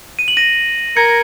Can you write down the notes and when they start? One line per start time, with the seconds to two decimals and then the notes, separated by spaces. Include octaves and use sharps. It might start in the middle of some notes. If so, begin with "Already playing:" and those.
0.19 D#7
0.28 F#7
0.37 A#6 D#7
0.96 A#4 G#6 C#7